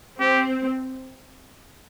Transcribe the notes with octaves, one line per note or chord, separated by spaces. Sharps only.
C4 G4